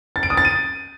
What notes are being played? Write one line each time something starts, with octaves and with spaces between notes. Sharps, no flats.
A6
D7
D#6
A6
D#7